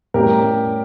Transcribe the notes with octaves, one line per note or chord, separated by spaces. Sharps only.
A2 G3 C#4 G4 A#4